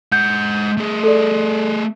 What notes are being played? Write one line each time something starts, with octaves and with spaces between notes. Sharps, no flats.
G#3 F#5 G6
A3 G#4
A4 D5